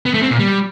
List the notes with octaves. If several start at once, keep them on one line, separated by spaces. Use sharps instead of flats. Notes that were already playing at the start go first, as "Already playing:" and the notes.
B3
A3
C4
A#2
G3